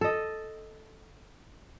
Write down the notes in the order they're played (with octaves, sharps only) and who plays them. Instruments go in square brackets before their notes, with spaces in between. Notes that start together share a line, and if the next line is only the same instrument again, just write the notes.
[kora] A4 D#5